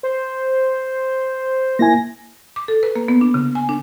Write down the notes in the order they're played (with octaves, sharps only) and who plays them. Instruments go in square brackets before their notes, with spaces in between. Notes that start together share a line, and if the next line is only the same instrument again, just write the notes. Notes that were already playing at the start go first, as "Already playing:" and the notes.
[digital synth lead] C5
[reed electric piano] A#3 E4 G#5 [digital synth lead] A#6
[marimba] D6
A4
B4
A#3
B3
D4
C#3
G#5
D4